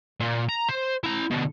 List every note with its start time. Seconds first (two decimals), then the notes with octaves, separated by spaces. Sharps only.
0.20 A#2
0.49 A#5
0.69 C5
1.03 E4 A#5
1.31 B2 D3